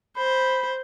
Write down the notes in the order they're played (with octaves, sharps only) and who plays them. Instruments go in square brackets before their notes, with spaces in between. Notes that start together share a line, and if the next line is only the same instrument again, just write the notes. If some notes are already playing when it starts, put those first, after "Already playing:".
[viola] C5 [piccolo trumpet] B5